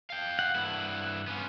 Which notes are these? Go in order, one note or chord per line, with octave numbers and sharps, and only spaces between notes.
F5 G5
F#5
G2 E4
B3 C#4 F4